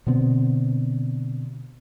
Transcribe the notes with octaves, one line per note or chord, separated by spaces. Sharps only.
B2 D3 B3 C4